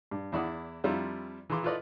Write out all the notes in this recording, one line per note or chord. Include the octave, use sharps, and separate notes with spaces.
G2
E2 E4 D5 F#5 D#6
F2 G3 D4 E4 F4 A#5
E3 G#4 A#5 C6 D6
E4 F4 A4 B4 D5 D#5